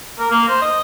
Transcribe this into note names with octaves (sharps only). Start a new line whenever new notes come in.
A#4
A#3
C5
D#5